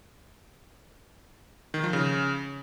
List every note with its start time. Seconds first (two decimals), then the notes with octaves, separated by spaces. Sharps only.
1.74 D#3
1.83 F3
1.93 C#3